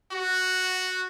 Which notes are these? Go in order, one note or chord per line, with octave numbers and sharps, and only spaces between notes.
F#4